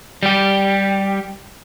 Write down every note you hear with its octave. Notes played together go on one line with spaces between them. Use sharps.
G3 G4